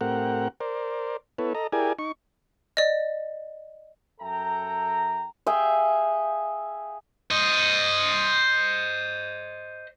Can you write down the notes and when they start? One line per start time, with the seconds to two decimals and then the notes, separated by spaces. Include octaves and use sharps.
0.01 A2 C4 G4 A#4 F#5
0.60 A#4 C5 D5
1.38 B3 E4 A4 B4 C#5
1.55 A4 D#5 A#5
1.72 E4 G4 G#4 A#4 D5 G#5
1.99 D#4 C#6
2.77 D5 D#5
4.21 F#2 A4 E5 G5 A#5
5.46 G#4 E5 F5 G5
7.31 C5 D#5